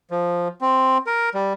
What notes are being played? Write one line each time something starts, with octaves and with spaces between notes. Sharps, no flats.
F3
C4
A#4
G3